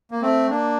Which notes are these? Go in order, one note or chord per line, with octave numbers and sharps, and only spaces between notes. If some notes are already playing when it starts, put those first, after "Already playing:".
A#3
A3 C4
A#3 D4